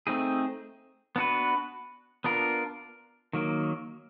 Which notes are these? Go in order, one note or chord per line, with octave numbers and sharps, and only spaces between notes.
A3 C4 D#4 G#4
B3 D4 F#4 B4
B3 D4 F4 A#4
D#3 F#3 A#3